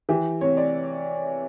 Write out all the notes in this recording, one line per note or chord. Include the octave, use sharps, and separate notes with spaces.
E3 G4
C3 C#5
D5